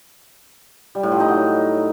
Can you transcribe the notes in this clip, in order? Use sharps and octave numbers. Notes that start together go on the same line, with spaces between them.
G3
A2
F3
D#4
F#3